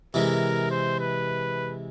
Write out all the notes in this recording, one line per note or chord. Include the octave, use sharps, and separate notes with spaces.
C3 E3 G#3 A#4
C5
B4